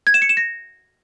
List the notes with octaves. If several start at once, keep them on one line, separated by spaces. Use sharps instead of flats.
G#6
E7
C#7
E7
A#6